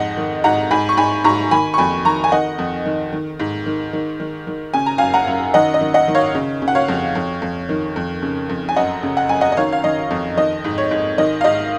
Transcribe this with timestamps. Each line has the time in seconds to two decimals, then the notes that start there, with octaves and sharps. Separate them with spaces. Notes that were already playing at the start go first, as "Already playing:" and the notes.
Already playing: F2 G#2 D#5 F#5
0.17 D#3
0.44 G#2 F#5 A#5
0.71 G#2 G#5 B5
0.89 C#6
0.97 G#2 G#5 B5
1.24 G#2 A#5 C#6
1.51 D#3 G#5 B5
1.74 C#6
1.78 F2 G#5 B5
2.05 D#3 A#5 C#6
2.24 G#5
2.32 D#3 D#5 F#5
2.58 F2
2.85 D#3
3.13 D#3
3.39 G#2
3.66 D#3
3.93 D#3
4.20 D#3
4.47 D#3
4.74 C#3 G#5
4.86 A#5
4.98 F#2 F5 G#5
5.14 F#5 A#5
5.27 F#2
5.54 D#3 D#5 F#5
5.74 D#5
5.81 D#3
5.94 D#5 F#5
6.08 D#3
6.15 C#5 F5
6.35 C#3
6.62 C#3
6.68 F#5
6.75 C#5 F5
6.88 F2
7.15 F2
7.42 F2
7.69 D#3
7.96 F2
8.22 C#3
8.49 F2
8.69 G#5
8.76 F#2 D#5 F#5
9.03 C#3
9.17 F#5
9.29 F#2 G#5
9.41 D#5 F#5
9.52 D#5
9.57 D#3 C#5 F5
9.73 F5
9.84 D#3 D#5
10.10 F2
10.37 D#3 D#5
10.64 G#2
10.78 C#5
10.91 G#2
11.18 D#3 D#5
11.41 F5
11.44 G#2 D#5